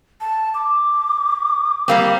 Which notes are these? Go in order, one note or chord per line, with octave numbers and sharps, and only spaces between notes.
A5
D6
G3 A#3 C4